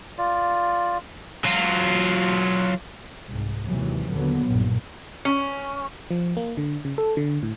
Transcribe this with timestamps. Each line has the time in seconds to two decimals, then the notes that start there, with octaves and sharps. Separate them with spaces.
0.18 F4 D5
1.45 F#3 F4
3.27 C2 G#2
3.65 G#1 D#2 C3 E3 F#3
4.11 D#2 A#2 D3 F#3 B3
4.44 B1 G2 A#2
5.25 C#4
6.11 F3
6.37 A#3
6.57 D3
6.85 C#3
6.98 A4
7.17 D3
7.43 A2